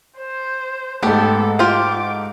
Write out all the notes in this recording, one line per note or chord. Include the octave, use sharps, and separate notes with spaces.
C5
G#2 A3 B3 G4 A4
F4 G4 C5 D6